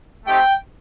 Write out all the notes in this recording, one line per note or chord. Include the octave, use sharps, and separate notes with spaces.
A3 C4 D#4 G4 G5